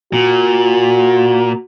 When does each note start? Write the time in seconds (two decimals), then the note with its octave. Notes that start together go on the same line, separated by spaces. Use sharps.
0.13 A#2 F#4